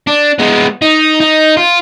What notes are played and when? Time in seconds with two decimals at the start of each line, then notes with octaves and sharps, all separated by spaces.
0.07 D4
0.39 G#3 B3
0.82 D#4
1.20 D#4
1.57 F4